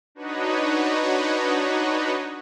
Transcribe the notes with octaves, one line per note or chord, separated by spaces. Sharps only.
D4 D#4 F#4 B4 C#5 D#5